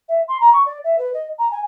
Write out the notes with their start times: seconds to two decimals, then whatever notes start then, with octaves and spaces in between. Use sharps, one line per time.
0.08 E5
0.28 C6
0.40 A#5
0.52 C#6
0.66 D5
0.84 E5
0.98 B4
1.13 D#5
1.38 A#5
1.51 G#5